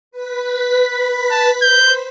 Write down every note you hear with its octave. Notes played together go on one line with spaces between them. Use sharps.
B4 B6
A5
C5 G6